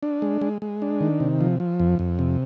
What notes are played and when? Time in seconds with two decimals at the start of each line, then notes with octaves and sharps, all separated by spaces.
0.03 D4
0.22 G#3
0.41 G#3
0.62 G#3
0.82 D4
1.01 D#3
1.20 C3
1.41 F3
1.60 F3
1.80 F2
1.99 F2
2.19 C3